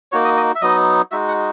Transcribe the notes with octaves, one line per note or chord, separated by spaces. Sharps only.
A#3 D#4 F#4 C#5
D#5
D#5
E5
F#3 B3 D#4 D#5
G#3 D#4 F#4 E5
F#5